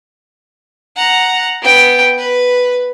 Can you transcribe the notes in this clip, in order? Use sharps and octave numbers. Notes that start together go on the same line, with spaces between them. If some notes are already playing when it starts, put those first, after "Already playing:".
F#5 A#5
B3 G5
B4